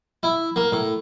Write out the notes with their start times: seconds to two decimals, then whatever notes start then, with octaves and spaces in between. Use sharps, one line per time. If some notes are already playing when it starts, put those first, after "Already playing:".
0.23 E4
0.56 A#3
0.72 A2